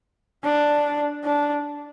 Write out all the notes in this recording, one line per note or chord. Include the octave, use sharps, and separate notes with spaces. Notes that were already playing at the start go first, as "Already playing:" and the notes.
D4
D4